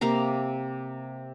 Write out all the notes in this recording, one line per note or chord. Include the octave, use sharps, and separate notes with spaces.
C3 A#3 F5 A#5